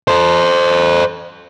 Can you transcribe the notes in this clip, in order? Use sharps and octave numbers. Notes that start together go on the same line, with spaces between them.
A4 C5